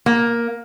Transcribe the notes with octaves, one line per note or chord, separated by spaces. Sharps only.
A#3